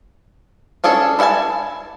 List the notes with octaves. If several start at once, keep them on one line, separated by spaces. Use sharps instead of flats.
C#4 D4 G#4 A4
E4 E5 F#5 G#5 A5